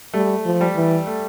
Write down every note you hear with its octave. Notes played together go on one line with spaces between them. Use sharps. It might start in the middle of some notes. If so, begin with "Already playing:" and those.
G3 A3
F3
G3
E3
A3